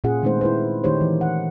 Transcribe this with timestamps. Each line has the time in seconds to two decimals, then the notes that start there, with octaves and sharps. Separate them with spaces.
0.04 A#2 C#4 F4 G#4 F#5
0.22 D#3 G#3 A3 C4 D#4 C5
0.41 E4 B4 C5
0.84 D#3 A3 D#4 G4 C5 C#5
1.01 E3
1.21 F#5